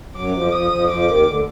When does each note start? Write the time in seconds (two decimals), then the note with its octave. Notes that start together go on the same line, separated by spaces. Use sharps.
0.15 F#2 F#3 D6
0.34 F2 F3
0.52 F2 F3 D#6
0.71 F2 F3
0.89 F2 F3 D6
1.07 D#2 D#3
1.26 D2 D3